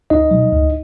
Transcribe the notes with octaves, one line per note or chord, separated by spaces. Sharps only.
C#2 D#4 D#5
B2 F#3
C#2